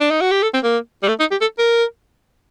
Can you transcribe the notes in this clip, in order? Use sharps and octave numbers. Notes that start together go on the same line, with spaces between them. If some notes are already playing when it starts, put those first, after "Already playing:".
D4
D#4
F#4
G4
A4
C4
A#3
G3
A3
D#4
G4
A4
A#4